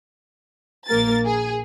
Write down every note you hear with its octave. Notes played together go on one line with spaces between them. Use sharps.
A#1 A#3 A#4 A6
G#4